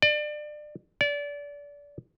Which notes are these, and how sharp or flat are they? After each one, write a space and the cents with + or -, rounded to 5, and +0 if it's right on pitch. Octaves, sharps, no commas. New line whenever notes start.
D5 +30
D5 -25